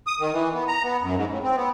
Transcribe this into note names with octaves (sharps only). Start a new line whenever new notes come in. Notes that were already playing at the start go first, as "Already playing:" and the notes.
D#6
D#3
E3
B3
A#5
B3
F#2
G#2
A2
C4
B3